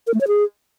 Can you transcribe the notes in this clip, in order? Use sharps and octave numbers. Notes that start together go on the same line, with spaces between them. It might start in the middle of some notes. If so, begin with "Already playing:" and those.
A#4
A3
C#5
G#4